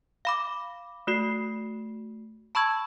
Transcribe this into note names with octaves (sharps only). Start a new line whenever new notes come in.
F5 B5 D6
A3 F#4 C7
A5 B5 C#6 E6 G#6